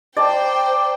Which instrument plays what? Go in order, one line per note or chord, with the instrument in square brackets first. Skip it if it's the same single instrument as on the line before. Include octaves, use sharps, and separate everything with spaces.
[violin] C5 G5 [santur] D5 A5 A#5